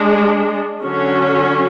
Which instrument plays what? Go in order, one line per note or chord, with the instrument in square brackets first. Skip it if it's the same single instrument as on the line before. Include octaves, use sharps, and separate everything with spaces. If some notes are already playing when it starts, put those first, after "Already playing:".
Already playing: [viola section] G#3 D4
D3 F#3 C#4